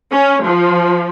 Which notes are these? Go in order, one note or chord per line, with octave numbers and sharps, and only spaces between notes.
C#4
F3